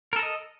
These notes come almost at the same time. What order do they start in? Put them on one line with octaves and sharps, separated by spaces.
A#4 A4 A#5 D#5